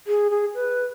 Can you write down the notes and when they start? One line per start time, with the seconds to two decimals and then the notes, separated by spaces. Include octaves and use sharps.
0.07 G#4
0.30 G#4
0.55 B4